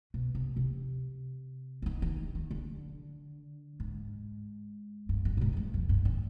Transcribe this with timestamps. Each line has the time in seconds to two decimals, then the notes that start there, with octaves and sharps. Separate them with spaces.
0.14 B2
0.35 C3
0.57 C3
1.82 F3
1.86 D#3
2.02 D#3
2.35 D#3
2.51 D3
3.80 G#2
5.09 G2
5.25 G2
5.37 B2
5.41 G#2
5.53 F2
5.57 G2
5.74 F2
5.89 G2
6.05 D3